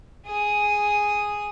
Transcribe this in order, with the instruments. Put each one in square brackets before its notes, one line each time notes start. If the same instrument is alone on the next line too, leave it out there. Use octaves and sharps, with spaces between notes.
[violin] G#4 D#6